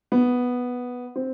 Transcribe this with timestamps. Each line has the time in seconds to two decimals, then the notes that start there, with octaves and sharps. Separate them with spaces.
0.12 B3
1.16 C4